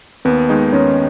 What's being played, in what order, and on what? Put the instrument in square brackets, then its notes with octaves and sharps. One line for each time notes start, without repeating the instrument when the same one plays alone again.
[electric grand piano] D#2 [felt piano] B3
[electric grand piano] D#3 G#3 D#4
[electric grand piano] D#2 [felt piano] C#4